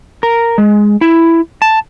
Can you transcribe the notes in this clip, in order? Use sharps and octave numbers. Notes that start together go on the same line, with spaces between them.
A#4
G#3
E4
A5